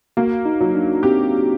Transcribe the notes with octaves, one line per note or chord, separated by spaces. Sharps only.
A#3 F#4
D#4
F#3
D4
C4 G4